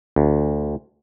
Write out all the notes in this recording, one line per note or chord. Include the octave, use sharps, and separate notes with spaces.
D2